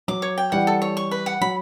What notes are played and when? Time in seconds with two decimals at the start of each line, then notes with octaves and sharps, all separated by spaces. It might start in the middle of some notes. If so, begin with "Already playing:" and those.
0.08 F#3 D6
0.22 C#5
0.38 G5
0.52 E3 G3 F#5
0.67 A4
0.82 C#5
0.97 C#6
1.11 B4
1.26 F#5
1.41 F#3 B5